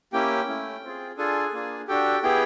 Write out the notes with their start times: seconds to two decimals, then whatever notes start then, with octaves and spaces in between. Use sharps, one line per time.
0.13 A#3 C#4 E4 G4 G5
0.48 A3 C#4 E4
0.83 C4 F4 G#4
1.17 D4 F4 G#4 A4 G#5
1.53 A#3 D4 F4 G#4
1.87 D4 F#4 G4 A4 G5
2.23 B3 E4 G4 G#4 G5